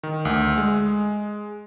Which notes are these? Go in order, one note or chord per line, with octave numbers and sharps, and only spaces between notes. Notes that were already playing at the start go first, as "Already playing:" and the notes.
D#3
D2
G#3